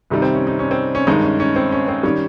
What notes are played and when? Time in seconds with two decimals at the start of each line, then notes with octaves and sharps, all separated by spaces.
0.10 C2 C3 D#3 G3 D#4
0.22 C4
0.35 C#4
0.47 D#4
0.59 C#4
0.71 C4
0.95 C#4
1.07 G2 D#3 G#3 D#4
1.23 C#4
1.40 C#4
1.56 C4
1.72 C#4
1.88 C4
2.03 D#3 G3 C#4